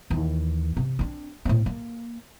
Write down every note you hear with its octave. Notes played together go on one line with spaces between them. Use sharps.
D#2 E3
C3
C4 D4
A2 C4
A#3